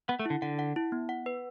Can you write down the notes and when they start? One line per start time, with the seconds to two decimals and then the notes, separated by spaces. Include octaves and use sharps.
0.09 B3 F#5
0.19 A3
0.26 D3 E4
0.42 D3 F#5
0.59 F#5
0.76 E4
0.92 B3
1.09 F#5
1.26 B4